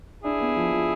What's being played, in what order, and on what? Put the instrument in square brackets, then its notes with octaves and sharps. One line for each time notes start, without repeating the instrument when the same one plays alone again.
[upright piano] D4 [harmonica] E4 G#4
[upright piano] B3
F3
F3